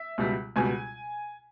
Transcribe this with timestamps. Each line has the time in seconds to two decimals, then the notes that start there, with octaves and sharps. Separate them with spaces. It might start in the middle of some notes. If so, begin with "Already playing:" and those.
Already playing: E5
0.18 C#2 B2 G3
0.56 C#2 B2 G3 G#5